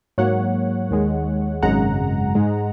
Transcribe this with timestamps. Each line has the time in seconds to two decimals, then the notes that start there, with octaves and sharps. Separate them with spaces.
0.18 G#2 F#3 A#3 C#5 F#5
0.90 D#2 D#3 G#3
1.62 G#1 F#2 C#3 G#3 F#5 A#5
2.35 G#2 G#3